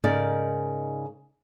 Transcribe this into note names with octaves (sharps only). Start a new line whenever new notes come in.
G#2 C#3 D#4 A#4 D5